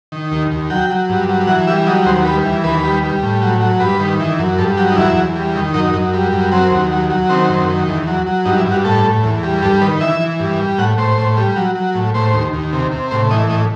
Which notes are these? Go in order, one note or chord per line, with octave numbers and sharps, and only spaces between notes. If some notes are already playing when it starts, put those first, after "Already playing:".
D#3
D#2
D#2
F#3 G5
F#3
G2
F#3
E3 F#5
G3 E5
F#3 D#5
D#2 C5
G3 B4
E3
D#2 B4
G3
G3
A2
F#3
F#3
G2 B4
D#3
E3
F#2
G2 A4
F#3 G4
D#4
E2 E4
E2
G3
D#3
F#2 D#4
F#2
G3
F#2
F#3 C4
D#2
F#3
F#3
D#3 C4
F#2
D#3
E2
F#3
F#3
G2 D#4
E4
G2
F#4
A2 A4
A2
E2
G3
G2 A4
D#3 B4
E3 E5
E3
G2
G3
A2 F#5
A2 C5
A2
G3
F#3
F#3
A2
A2 C5
D#2
D#2
C3
C3
A2 C5
E3 D#5
A2 D#5